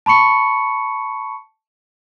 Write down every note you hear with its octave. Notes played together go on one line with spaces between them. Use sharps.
A5 B5 C#6 C#7